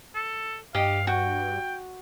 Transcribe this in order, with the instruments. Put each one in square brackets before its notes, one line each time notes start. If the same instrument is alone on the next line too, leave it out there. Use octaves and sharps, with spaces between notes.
[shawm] A4
[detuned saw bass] G2 [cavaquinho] G4 D#5 [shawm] F5
[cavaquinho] F#4 [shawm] G5